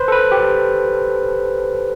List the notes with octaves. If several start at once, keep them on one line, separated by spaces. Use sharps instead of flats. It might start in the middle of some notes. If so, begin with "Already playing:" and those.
Already playing: B4 C5
A4
B4
G4